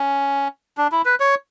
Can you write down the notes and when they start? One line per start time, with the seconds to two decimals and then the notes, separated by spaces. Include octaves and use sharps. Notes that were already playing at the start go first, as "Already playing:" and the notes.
Already playing: C#4
0.78 D4
0.92 E4
1.05 B4
1.20 C#5